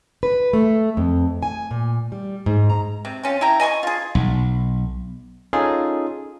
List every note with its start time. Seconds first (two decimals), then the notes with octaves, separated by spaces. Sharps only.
0.23 B4
0.53 A3
0.97 F2
1.43 G#5
1.71 A#2
2.12 G3
2.46 G#2
2.70 A#5
3.05 C3
3.23 C4 C#4 F4
3.41 E4 G4 G5 A#5
3.60 D#5 G#5 C6 C#6
3.83 F4 G#4
4.15 B1
5.53 C#4 D#4 F4 G#4 A4